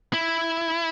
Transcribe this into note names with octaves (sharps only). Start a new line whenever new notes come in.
E4